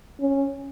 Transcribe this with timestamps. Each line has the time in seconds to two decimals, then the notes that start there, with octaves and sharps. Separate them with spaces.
0.21 C#4